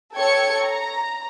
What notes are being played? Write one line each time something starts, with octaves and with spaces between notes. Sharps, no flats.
A4 C#5 G5 C#6 G#6 C#7
A#5